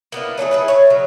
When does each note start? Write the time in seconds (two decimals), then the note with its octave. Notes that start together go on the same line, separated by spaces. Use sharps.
0.12 A#3 B3 D4 E4
0.38 F#3 A3 G4 G#4
0.51 E4 G#4 B4
0.68 C#5 E5
0.90 C#3 F#3 E4